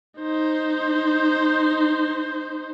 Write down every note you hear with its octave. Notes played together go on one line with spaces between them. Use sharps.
D#4 C5